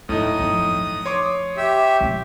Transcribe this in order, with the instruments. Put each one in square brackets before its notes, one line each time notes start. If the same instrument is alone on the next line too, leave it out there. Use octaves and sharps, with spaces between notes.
[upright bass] D#1 [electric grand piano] A2 D#4 [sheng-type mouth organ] D#6
[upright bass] F2
F2
[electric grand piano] C#5 C6 D6
[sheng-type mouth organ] G4 E5
[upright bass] E1 A3